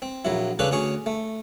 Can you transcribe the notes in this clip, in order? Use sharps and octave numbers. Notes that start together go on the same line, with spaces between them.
C4
A#1 F#3 E4
C#3 C#4 D4 A4 B4
D2 C#4 G#4 C#6
A3